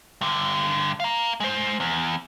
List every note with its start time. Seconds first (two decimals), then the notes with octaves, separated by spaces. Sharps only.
0.21 G2 D3
1.00 F5 A#5
1.40 G#3 C5
1.80 E2